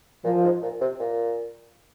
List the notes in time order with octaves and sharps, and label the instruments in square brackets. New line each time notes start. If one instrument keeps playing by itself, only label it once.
[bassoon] A#2 [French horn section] F3
[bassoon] G#2
A#2
C3
A#2